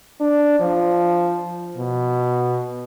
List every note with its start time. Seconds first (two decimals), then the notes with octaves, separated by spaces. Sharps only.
0.20 D4
0.60 F3
1.77 B2